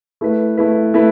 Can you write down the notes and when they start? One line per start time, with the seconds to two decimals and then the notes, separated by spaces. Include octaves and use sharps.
0.21 A3 E4 B4
0.58 A3 E4 B4
0.94 A3 E4 B4